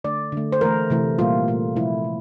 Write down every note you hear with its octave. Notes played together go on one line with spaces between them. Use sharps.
D3 A3 D5
D3 A3
C5
E3 A3 A#4
C3 E3 A3
A#2 G3 A#3 F4
A#2 A3
C3 F3 A3 E4
A3